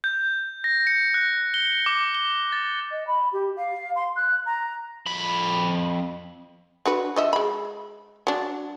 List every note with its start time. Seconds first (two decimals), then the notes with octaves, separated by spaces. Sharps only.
0.04 G6
0.64 A#6
0.87 C#7
1.14 F#6
1.54 G7
1.86 D6
2.15 G7
2.52 A6
2.91 D#5
3.07 B5
3.33 G4
3.57 F5
3.96 C6
4.16 F#6
4.46 A#5
5.07 F2 B5
6.86 D4 F#4 B4
7.16 F3 D#5 E5
7.33 G#3 B5
8.27 F#3 D4